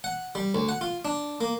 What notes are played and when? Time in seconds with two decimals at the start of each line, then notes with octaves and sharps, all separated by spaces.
0.04 F#5
0.35 G3
0.55 D2
0.69 F#5
0.81 F4
1.05 D4
1.41 A#3